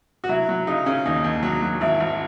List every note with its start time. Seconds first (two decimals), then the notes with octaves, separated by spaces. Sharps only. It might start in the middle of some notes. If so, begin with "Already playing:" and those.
0.24 F#4
0.29 F#3 E4
0.49 F#3
0.67 C#3 D#4
0.86 C#3 C#4
1.06 D#2 D#4
1.24 D#2
1.43 F#3
1.62 F#3
1.81 G#1 E4
2.00 G#1